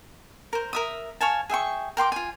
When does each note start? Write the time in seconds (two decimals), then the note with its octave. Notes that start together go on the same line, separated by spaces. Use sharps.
0.53 A#4 C5
0.73 A#4 E5 D#6
1.21 C#5 F5 G#5 A5
1.50 G#4 E5 G5 C#6
1.97 A#4 G5 C6 D6
2.12 F4 G#5